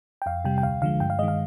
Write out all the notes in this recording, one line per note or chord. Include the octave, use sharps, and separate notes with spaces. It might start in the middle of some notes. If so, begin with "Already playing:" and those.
G5
F2 F5
C3 G3 G5
G5
D2 F5
D3 F3 G#3 F5
G2 G5
F5
D#3 G#3 D#5
F5